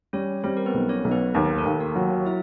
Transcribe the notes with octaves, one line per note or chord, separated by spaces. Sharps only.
G3 C#4 C#5
G3 C4 C5
A#4
B3 B4
B1
C#4 C#5
B1
B3 B4
D#2 A#3 A#4
A3 A4
D#2
A#3 A#4
F#3
E4 E5